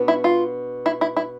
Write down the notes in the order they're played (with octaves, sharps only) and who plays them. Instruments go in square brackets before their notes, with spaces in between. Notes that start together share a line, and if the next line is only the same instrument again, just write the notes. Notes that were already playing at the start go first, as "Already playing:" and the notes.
Already playing: [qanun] B2 B3 D4
[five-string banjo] E4
F4
E4
E4
E4